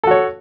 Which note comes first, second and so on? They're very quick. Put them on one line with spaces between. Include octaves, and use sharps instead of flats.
A4 F#4 C#5